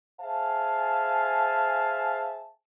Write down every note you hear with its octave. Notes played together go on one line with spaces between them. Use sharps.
G#4 C5 E5 F5 G#5 A5